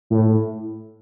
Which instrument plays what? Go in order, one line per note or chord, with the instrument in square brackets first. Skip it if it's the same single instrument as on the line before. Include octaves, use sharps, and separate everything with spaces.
[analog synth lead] A2